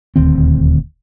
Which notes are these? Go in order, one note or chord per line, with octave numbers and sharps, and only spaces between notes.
D#1 D2 D#3 C4